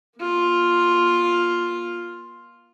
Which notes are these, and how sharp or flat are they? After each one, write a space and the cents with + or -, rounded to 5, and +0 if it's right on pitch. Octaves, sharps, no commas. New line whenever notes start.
A#3 +35 F4 +5